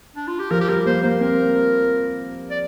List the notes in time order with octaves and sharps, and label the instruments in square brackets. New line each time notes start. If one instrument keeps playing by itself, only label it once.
[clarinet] D4
F4
G4
[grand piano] F3 [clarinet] A#4
[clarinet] G4
[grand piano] G3 [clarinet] A#4
[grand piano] A#3 [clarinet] C5
[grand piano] A#3 [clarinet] C5
[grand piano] C4 [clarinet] A#4
[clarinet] D5